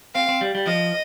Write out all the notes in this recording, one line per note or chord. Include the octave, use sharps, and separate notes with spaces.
C4 F5
C4
G3
G3
F3 D#5